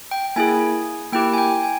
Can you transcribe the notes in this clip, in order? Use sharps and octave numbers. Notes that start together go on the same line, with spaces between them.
G5
A#3 E4 G#4 G#5
A#3 E4 G4 G5
G#5
G5
G#5